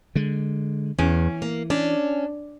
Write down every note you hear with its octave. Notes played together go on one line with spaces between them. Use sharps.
D3 G#3
E2 E3 C#4
A#3
C#4 D4